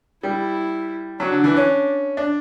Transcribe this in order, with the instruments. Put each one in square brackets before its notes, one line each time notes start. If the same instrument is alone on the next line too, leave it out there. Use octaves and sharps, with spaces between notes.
[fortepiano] G3 [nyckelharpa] E4
[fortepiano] F#3 [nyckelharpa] D4
[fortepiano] D3
E3
C#4
D4